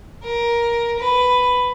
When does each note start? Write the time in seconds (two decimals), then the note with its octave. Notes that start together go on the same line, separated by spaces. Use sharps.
0.23 A#4
0.99 B4